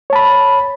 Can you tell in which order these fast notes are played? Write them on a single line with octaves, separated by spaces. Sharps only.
C#5 A5 B5